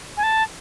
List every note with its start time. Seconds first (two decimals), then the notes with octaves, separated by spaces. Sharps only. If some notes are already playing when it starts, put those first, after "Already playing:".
0.17 G#5
0.23 A5